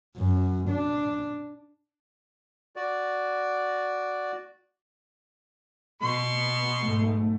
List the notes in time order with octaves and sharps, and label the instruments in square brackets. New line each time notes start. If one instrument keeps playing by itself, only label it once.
[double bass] F#2
D4
[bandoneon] F#4 D5
[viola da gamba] B2 B3 [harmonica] C6 C#6
[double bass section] B1 G#2 A3